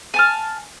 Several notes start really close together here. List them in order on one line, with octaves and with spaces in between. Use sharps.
G#5 A5 F6